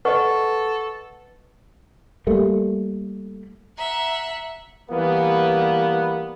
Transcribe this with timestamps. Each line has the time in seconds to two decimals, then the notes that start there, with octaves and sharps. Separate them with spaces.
0.05 A4 B4 D#5 F#5 C#6
2.27 G3 A3 A#3
3.78 E5 F#5 A#5
4.91 E3 G3 A#3 B3